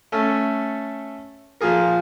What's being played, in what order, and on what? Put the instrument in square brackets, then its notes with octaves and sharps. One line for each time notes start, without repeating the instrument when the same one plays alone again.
[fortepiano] A3 C#4 A4
A#2 F3 A#3 G#4 A#4